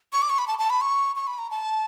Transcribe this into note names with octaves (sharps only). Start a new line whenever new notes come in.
C#6
D6
C#6
B5
A5
A5
B5
C#6
C#6
B5
A#5
A5